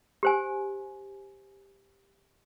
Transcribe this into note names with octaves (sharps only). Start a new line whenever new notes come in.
G4 C5 G#5